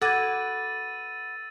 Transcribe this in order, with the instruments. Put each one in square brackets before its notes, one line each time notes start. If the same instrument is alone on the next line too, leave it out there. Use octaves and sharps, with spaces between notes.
[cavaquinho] F#4 B4 D6 [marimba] A4 G#6 [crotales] E6 A6 D#7